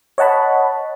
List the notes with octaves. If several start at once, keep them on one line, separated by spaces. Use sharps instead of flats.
C#5 D#5 F#5 A5 B5